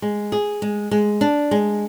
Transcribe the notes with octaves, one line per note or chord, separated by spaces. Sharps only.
G#3
G#4
G#3
G#3
D4
G#3